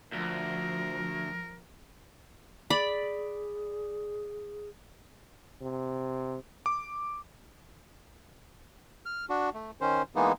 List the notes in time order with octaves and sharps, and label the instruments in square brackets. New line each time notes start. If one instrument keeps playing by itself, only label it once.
[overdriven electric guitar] D2 [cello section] F3 [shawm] A#4
[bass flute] G#4 [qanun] D5 B5
[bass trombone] C3
[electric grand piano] D6
[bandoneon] F6
D4 F#4
A3
D#3 C#4 C5
E3 G#3 A#3 B3 D#4